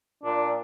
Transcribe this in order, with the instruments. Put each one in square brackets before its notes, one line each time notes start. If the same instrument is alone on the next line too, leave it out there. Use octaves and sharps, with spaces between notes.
[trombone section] A#2 [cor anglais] D4